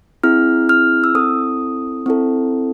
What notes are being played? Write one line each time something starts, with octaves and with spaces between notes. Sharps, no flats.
C4 E4 G#4 F6
F6
E6
C4 E4 A4 D#6
C4 E4 A4